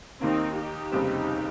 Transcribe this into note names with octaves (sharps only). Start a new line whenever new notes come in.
D#2 D#3 A#3 C4 D#4
D#4 G4
F1 D#2 C#3 G3 C4